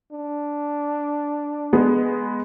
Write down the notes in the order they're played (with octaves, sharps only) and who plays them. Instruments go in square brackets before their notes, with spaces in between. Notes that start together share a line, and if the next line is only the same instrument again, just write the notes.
[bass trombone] D4
[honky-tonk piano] G#3 B3